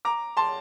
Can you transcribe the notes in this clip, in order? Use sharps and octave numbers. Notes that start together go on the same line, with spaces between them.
A#5 D6
A5 C6